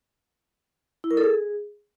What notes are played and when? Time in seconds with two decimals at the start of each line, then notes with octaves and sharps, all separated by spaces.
1.04 E4
1.11 A#4
1.17 A4
1.24 G#4